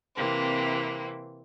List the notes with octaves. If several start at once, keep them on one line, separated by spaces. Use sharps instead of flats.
C3 E3 A#3 C4